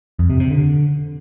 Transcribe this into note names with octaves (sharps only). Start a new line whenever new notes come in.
F2
C3
C3
D3